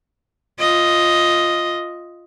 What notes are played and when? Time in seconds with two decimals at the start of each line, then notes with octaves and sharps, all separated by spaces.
0.59 F4 D#5